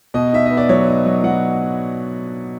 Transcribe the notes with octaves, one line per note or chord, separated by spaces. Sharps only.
B2 D#5
D#4 E5
D#5
B3
D5
F#3 C#5
D#4
F#3
F#3 F#5